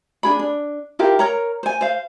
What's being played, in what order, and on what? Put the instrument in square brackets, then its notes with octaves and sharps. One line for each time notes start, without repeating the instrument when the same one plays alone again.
[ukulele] D4 G#4 B5
D4
E4 F4 G4 A#4
A#4 C#5 A#5
C5 G#5
C5 F5